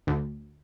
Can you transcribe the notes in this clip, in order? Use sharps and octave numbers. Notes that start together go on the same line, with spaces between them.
D2